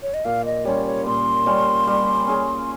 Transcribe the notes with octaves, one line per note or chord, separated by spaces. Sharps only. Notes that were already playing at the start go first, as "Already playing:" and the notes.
C#5
D#5
A#2 F5
D#5
G3 C#4 F4 C#5
C#5
A#2 C6
G3 C#4 F4
G3
C#4 G#4